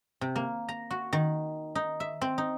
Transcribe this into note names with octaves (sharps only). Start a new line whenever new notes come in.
C3
A#3
A#5
F#4
D#3
D#4
E5
C4
D#4